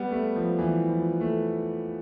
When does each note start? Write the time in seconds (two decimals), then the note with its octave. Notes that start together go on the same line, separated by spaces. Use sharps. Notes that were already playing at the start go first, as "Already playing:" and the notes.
Already playing: G3 B3
0.11 A3
0.36 F3
0.59 E3
0.89 F3
1.20 A3